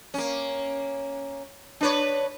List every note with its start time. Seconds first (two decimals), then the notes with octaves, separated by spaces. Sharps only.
0.14 A#3 C#4
1.81 D4 B4 C#5